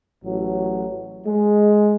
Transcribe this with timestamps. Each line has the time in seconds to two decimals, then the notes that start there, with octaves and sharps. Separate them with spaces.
0.24 A1 F#3
1.26 G#3